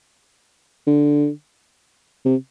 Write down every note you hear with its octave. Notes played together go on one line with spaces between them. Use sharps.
D3
C3